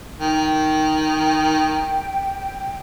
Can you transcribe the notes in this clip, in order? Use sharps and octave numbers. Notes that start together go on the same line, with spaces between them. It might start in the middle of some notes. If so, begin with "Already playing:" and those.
D#3 G5